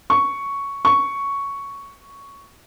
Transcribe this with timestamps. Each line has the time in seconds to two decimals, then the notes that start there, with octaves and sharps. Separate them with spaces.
0.10 C#6
0.85 C#6